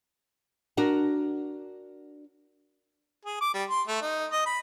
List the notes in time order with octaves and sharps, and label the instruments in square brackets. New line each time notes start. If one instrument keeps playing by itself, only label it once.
[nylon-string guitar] D4 F#4 A#4
[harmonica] G#4
D6
G3
C6
A3
D#4
D#5
B5